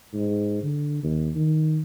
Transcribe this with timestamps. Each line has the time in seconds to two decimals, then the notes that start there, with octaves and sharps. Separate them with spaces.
0.14 G#2
0.63 D3
1.03 D#2
1.35 D#3